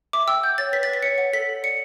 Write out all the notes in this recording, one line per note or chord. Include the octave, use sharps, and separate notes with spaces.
E5 D6
G5 E6
F#5 G6
C#5 A6
B4 B6
A6
B4
B6
C#5 C#7
F#5 C#7
A4 B6
A4
D5 C#7